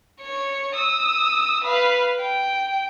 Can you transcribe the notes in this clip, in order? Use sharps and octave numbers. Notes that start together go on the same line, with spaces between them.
C#5 C#7
D#6 E6
B4 F5
G5